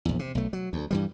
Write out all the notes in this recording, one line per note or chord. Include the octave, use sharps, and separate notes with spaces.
A#1 E2
C3
B1 A3
F#3
D2
G2 E3 G3